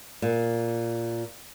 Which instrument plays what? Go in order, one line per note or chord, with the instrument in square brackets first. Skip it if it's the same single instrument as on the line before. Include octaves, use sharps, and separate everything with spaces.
[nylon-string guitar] A#2